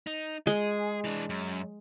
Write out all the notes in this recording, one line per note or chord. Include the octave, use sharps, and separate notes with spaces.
D#4
G#3 G#4
E3 D4
F#2